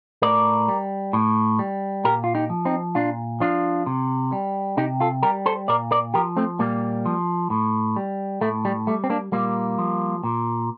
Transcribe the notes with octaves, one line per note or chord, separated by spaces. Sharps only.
A2 A#4 D5
G3
A2
G3
A#2 G4 A#4
F4
D#4 G4
F3
C4 D#4
A#2 D4 F4
F3 D4 F4
C3
G3
C3 D#4 G4
F4 A4
G3 G4 A#4
A4 C5
A#2 A#4 D5
A#4 D5
F3 G4 A#4
A3 C4
A#2 G3 A#3
F3
A2
G3
A2 A3
G3
G3 A3
C4
A#3 D4
A#2 G3 A#3
F3
A#2